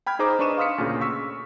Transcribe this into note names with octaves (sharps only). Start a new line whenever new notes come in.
G5 B5 F6 G#6
D#4 G#4 C5 A#5 D6
D4 B4 D#5 C#6 D#7 E7
F5 C6 D#6 F6 B6 C#7
D2 A#2 C#3
C#6 E6 B6